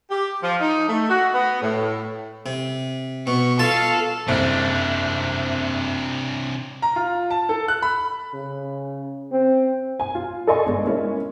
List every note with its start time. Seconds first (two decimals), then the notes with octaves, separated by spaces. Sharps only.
0.11 G4
0.43 F3
0.60 D#4
0.88 A3
1.09 F#4
1.33 B3
1.62 A2
2.46 C3
3.27 B2 C#6
3.59 F4 A4 F5 A5
4.28 F#1 C2 C3 C4 D4
6.82 A#5
6.96 F4
7.30 A5
7.49 A4
7.68 F#6
7.82 B5
8.34 C#3
9.32 C4
10.00 G#5
10.15 F4
10.47 A4 D5 D#5 G#5 C6 C#6
10.66 G1 G#3 D5
10.85 G#3 A#3 C#4 E4